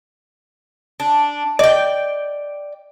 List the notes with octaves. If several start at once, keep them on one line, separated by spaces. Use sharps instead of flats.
D4
D5 D#5 G5